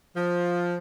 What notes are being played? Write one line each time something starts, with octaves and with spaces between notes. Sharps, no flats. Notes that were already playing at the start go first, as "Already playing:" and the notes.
F3